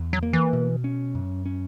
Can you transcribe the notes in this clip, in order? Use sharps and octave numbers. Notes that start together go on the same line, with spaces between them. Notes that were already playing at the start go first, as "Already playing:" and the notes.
Already playing: E2
F#3
A#3
E3
B2
C#4
F#2
C#4